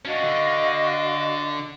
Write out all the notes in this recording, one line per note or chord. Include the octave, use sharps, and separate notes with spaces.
C#4 D4 F#4 D#5 F5
D3